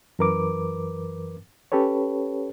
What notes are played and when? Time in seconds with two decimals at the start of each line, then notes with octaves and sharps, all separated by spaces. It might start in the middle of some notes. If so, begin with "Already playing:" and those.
0.19 F#2 E3 A#4 B4 D6
1.72 C#4 G4 A4 B4 C#5